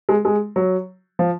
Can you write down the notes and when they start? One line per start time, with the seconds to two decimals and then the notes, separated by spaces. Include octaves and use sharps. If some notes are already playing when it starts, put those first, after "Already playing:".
0.09 G#3
0.25 G#3
0.56 F#3
1.19 F3